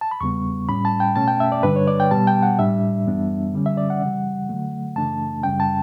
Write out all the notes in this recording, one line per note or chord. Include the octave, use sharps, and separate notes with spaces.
A5
B5
E2 C#3 G3 B3 C#6
A2 G3 C#4 B5
A5
G5
B2 A3 C#4 A5
G5
E5
D5
G2 D3 G3 D4 B4
C#5
D5
G5
B2 G3 B3 A5
G5
F#5
A2 G3 D4 E5
F#2 E3 G3 B3 D4
D3 G3 C#4
E5
D5
F#5
C#3 E3 G3
D3 F#3 A3
F#2 C#3 E3 A3 D4 A5
F#2 C#3 G3 C#4 G5
A5